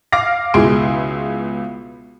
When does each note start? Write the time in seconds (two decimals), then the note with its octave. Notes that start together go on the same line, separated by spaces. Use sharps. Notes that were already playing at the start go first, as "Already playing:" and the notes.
0.12 F5 D6 F6 A#6
0.54 C#2 B2 E4 G#4 C6 D7